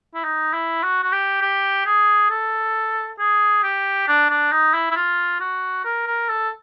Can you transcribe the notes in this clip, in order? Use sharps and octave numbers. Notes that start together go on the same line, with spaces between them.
E4
D#4
E4
F#4
F#4
G4
G4
G#4
A4
G#4
G4
D4
D4
D#4
E4
E4
F4
F#4
A#4
A#4
A4